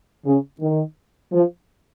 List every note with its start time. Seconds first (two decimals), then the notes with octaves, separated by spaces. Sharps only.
0.26 C#3
0.61 D#3
1.33 F3